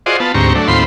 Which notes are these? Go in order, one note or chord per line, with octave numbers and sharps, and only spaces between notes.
F4 F#4 G#4 C5 D5 D#5
B3 F4 A5
D2 G#2 C4 G4 A#5 C#6
F#3 A3 D4
D#2 A2 C4 F4 B5 C6